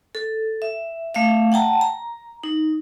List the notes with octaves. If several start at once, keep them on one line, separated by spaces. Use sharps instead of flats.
A4
E5
A3 E5 F5
F#5 G5 A5 A#5
A#5
D#4